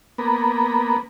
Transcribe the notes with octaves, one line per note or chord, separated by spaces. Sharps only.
A#3 B3